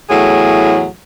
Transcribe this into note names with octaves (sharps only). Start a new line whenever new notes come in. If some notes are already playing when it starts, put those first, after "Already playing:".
E2 A2 F#3 G#4